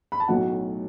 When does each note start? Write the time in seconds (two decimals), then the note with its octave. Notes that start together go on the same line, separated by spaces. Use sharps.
0.12 B5
0.20 A5
0.28 B1 A2 F#3 A3 F#5